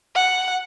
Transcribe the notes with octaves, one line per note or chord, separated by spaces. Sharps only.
F#5